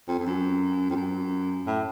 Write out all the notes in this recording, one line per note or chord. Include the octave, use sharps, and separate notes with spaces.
F2
F2
F#2
F2
F#2
A2